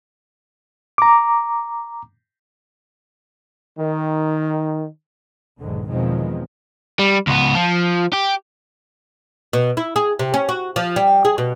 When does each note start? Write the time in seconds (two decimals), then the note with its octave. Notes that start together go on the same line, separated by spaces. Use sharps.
0.98 A#5 D6
3.78 D#3
5.60 B1 E2 G#2 D3 D#3
5.89 E2 B2 D#3 F3 G#3 C4
6.99 G3
7.27 C#2 B3
7.55 F3
8.13 G4
9.53 B2
9.77 E4
9.96 G#4
10.19 C3
10.34 C#4
10.49 F#4
10.76 F3
10.96 G3
11.25 G#4
11.38 B2